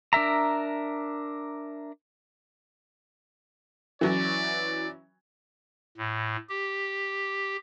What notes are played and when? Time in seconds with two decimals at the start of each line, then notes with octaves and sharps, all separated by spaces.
0.13 D4 A#4 E5 A#5
4.01 E3 F#3 C#4 D5
5.98 A2
6.49 G4